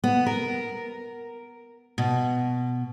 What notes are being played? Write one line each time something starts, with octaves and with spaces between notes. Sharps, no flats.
B3
A#4
B2